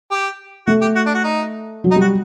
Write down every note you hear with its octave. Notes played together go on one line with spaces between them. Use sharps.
G4
A3 F#4
G4
F#4
D4
F#4
D#4
F#3
D#4
G3
F#4